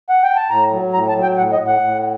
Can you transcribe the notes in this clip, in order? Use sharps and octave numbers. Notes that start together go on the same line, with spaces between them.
F#5
G5
A5
A2 A#5
F#3
A2 A#5
A5
F#3
G5
A2 F#5
D#5
A2
F#5
A2